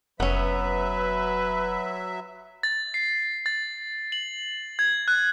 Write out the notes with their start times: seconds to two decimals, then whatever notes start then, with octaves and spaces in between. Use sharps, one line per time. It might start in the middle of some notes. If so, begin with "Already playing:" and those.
0.20 F1 F#3 B3 C#4 B4 E5
2.63 A6
2.94 C7
3.46 A6
4.12 F#7
4.79 G#6
5.08 F#6